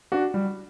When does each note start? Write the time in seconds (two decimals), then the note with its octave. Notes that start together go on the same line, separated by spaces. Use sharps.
0.12 D4 F#4
0.34 G3